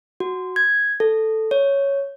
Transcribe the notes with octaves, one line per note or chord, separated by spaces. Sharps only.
F#4
G#6
A4
C#5